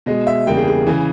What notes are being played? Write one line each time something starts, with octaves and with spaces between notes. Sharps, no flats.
B2 G#3 D#5
E5
E2 C#3 G3 A#3 G5
G#4
G#4
C#3 E3 G#5